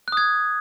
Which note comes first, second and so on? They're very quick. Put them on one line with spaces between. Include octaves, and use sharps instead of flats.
F#6 D#6 G#6